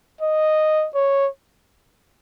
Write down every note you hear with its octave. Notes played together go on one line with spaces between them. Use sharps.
D#5
C#5